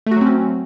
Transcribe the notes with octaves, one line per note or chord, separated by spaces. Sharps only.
F#3 A3 C4 C#4 F#4